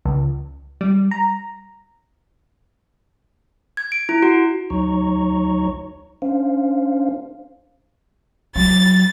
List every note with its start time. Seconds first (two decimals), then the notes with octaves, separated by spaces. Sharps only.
0.05 C#2
0.81 G3
1.11 A#5
3.77 G#6
3.92 D7
4.09 E4
4.23 F#4
4.70 D2 F#3 D#4 C#5 A#5 C#6
6.22 C#4 D4 C5 F5
8.56 F#3 A6